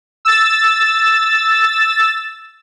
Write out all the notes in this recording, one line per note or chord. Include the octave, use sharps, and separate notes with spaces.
E6 A6